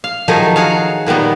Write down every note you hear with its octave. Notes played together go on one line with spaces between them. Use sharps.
F5
D#3 F3 F#3 A3 D#4 G#4
F#4 G#4 C#5 F5
A#2 D#3 G3 B3